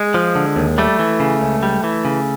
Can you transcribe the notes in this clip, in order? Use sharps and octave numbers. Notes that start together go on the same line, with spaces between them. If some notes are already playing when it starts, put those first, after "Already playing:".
Already playing: G#3
F3
D3
D#2
G3 A3
E3
C#3
C#2
G3
E3
C#3